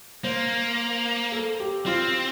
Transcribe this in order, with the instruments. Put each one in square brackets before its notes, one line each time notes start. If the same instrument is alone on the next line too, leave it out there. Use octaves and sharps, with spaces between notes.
[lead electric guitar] A#3 [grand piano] C5
[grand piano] A4
G4
[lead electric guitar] C4 [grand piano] F4